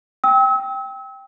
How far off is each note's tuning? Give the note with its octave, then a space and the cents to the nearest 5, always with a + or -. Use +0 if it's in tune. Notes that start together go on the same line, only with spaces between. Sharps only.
G5 +0 E6 -35